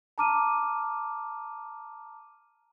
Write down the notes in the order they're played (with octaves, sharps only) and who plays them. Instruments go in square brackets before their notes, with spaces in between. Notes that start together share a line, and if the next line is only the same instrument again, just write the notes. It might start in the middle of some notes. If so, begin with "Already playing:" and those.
[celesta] A5 A#5 D6 F6 D#7